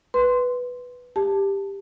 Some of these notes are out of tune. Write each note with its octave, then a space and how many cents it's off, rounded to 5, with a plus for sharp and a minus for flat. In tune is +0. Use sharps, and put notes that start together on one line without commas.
B4 +0 C6 +0
G4 +10 A5 +0